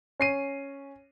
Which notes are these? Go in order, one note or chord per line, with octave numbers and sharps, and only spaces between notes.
C#4 C7 D#7